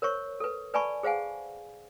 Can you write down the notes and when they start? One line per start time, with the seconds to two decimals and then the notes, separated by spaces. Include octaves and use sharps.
0.02 A#4 C5 C#5 C#6
0.40 A4 B4
0.74 B4 D5 G#5 A5 B5 C#6
1.03 G#4 C5 F5 F#5 G#5